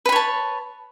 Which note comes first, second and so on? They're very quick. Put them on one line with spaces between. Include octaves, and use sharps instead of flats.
B4 B5 C#5 A5